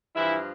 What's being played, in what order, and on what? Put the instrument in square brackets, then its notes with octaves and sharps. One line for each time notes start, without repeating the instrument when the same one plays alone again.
[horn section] G2 E3 F3 E4